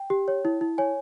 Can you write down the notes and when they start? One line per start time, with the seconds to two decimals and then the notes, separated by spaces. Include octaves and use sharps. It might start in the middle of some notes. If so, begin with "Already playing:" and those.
Already playing: G5
0.10 G4
0.28 C#5
0.45 E4
0.61 E4
0.78 C#5 G#5